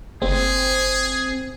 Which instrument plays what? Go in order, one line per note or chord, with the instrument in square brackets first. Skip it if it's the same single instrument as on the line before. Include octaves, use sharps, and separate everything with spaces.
[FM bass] F#1 [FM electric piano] C4 [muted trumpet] G#4